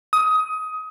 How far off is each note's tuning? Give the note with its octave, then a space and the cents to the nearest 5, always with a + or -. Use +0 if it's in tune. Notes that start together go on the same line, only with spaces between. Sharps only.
D#6 +20